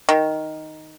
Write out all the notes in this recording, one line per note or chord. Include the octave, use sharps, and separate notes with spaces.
D#3